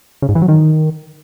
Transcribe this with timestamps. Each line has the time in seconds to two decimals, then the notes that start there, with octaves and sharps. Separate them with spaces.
0.22 C#3
0.29 G#2
0.35 E3
0.42 F#3
0.48 D#3